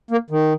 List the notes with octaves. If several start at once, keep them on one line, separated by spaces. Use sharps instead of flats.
A#3
D#3